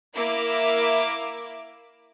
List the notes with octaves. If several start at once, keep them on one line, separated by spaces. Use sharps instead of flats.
A#3 E4 A#4 E5 D6